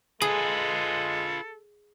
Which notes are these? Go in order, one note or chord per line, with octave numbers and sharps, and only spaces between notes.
G#3 F4 G#4 A4 B4